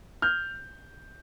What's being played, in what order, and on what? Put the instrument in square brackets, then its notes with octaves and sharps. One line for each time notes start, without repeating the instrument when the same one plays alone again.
[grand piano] F6 G6